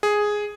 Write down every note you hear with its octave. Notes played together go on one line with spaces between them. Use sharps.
G#4